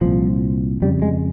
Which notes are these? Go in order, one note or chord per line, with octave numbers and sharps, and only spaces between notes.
C2 A#2 F3
F2 C#3 G3
G#3